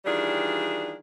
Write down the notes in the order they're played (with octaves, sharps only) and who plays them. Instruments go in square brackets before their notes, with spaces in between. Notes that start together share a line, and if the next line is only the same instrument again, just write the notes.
[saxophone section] D#3 E3 G3 D4 F4 G#4